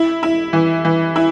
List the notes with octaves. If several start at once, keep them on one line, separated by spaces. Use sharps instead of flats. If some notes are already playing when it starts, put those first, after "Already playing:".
Already playing: E4
E4
E3
E3
E4